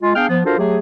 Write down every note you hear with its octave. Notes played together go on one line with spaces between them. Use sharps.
G#3 F4
B3 D4 G#4 F5 G5 F6
F3 B3
D4 F4 F#4 A4 A#4 C5
F#3 A3 G4 G#4